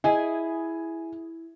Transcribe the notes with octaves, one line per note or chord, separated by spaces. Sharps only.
E4 G#4 D#5 E5 G#5